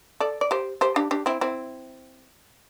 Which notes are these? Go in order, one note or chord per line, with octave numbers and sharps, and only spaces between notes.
A4 D5
D5
G4 C5
G4 C5
D4 G4
D4 G4
C4 E4
C4 E4